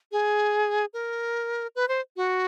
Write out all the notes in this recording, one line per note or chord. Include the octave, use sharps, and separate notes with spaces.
G#4
A#4
B4
C5
F#4